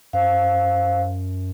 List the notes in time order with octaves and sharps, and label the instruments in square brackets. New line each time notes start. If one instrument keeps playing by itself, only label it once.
[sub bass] F#2 [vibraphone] C5 F5